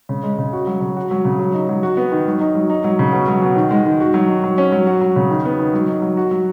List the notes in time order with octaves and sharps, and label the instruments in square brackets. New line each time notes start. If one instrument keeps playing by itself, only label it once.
[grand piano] C#3
G#3
C#3
F#4
F#3
C#3
F#4
F#3
C#3
F#3
D#4
F#3
F#4
B3
D#3
F#3
D#4
F#3
D#4
F#3
C#3
B2
F#3
B2
D#3
G#3
D#3
F#4
F#3
D#3
F#3
C#4
F#3
F#4
F#3
C#3
D#3
B3
D#3
F#3
D#4
F#3
F#4
F#3